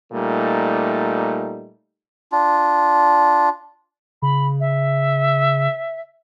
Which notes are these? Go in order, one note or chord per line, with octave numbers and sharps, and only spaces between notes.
A#2 G3 A3 D#4
D4 F4
C#3 B5
E5